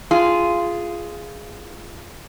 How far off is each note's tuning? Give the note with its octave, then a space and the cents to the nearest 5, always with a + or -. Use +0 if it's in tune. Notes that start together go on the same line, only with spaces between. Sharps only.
F4 -15 G#4 +0